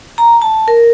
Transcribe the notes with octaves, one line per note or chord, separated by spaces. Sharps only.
A#5
A5
A#4